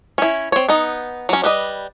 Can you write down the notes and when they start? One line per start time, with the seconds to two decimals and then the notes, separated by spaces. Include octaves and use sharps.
0.18 C#4 E4
0.52 C4 C#5
0.69 B3 D#4
1.29 F#3 C#4
1.44 G3 B4 D#5